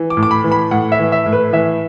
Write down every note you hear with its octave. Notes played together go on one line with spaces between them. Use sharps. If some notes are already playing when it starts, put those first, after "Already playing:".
Already playing: E3
D6
A2
D6
B5
E3
B5
A2 F#5
E5
E3
E5
A2
B4
E3 E5